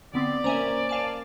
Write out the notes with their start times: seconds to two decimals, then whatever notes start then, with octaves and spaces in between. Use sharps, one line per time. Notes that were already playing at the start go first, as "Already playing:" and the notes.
0.14 D3 B3 C4 D5
0.44 A#3 C#4 C5 E5 G#5 A#5
0.89 F5 G#5 A5